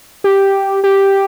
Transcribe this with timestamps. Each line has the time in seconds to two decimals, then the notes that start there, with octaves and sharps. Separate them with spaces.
0.24 G4
0.84 G4